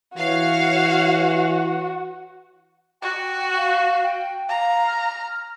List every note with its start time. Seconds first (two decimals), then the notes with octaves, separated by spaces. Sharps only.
0.17 E3 F#4 C#5 F5
3.02 F#4 G5
3.57 F5
4.04 G5
4.48 F5 A#5
4.87 F6